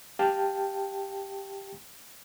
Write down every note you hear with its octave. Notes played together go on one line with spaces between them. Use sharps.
G4 F5 G5 A5